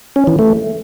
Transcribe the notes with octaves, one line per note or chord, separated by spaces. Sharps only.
C#4
E3
A3